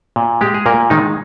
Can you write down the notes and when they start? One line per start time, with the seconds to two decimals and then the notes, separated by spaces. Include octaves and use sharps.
0.16 A#2
0.41 G#3 G4
0.54 G#4
0.66 A#2 A#3 A#4
0.90 D#3 G#3 D#4